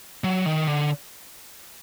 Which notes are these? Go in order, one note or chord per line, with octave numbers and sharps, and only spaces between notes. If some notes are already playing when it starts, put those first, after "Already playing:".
F#3
D#3
D3